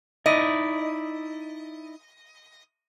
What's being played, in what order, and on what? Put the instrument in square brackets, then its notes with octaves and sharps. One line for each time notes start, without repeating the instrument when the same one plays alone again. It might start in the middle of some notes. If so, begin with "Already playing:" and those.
[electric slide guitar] D#4 E4 D5 [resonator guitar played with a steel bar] D#5